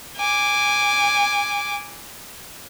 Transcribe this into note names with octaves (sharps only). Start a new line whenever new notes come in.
G#5 D6